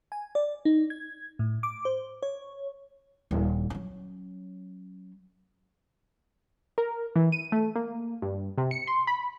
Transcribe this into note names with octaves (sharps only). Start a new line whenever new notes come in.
G#5
D5
D#4
G#6
A2
D6
C5
C#5
D#1
F#3 C#4
A#4
E3
D#7
A3
A#3
G2
C3
C#7
C6
B5